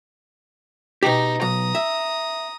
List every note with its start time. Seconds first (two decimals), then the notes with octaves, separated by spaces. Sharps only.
1.03 B2 D#4 G4
1.41 B1 A#5 D#6
1.75 E5